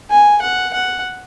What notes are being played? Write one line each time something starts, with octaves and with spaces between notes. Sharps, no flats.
G#5
F#5
F#5